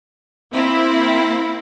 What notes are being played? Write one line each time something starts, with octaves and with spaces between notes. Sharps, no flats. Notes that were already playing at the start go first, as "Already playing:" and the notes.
A#3 C4 E4